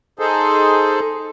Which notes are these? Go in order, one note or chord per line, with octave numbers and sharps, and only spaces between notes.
D#4 G#4 A4 C5